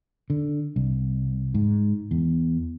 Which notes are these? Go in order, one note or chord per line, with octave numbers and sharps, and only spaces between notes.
D3
C2
G#2
E2